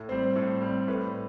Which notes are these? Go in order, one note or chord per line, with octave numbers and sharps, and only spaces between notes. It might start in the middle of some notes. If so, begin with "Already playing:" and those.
Already playing: A2
G3 C4 C5
A2 A4
G3 C4
A2 B4